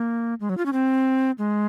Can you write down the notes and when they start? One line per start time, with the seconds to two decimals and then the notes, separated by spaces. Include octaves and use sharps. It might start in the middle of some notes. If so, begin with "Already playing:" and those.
Already playing: A#3
0.41 G#3
0.49 F#3
0.58 F4
0.66 C#4
0.73 C4
1.38 G#3